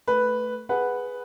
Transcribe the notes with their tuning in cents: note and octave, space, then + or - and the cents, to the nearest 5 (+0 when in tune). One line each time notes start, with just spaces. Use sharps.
A3 +0 B4 +0
G#4 +0 B4 +0 F#5 +0